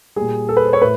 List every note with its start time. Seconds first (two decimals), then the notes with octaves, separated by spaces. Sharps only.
0.16 A#2 G3 G#4
0.49 A4
0.57 B4
0.65 C5
0.73 C#5
0.82 A2 B4